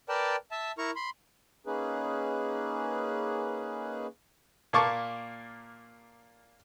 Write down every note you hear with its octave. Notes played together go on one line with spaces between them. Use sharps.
A#4 B4 D5 G5 A5
E5 A5
E4 A#4 A#5 C#6
B5 C6
A#3 C#4 D#4 G#4 B4
A#2 A#3 A5 C#6 D6